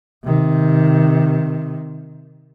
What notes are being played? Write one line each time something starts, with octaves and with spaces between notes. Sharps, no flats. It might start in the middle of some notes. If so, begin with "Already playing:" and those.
C3 D#3